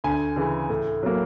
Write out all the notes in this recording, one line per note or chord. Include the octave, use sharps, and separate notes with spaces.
D2 G#5
C#3 E3
A2
F#3 A#3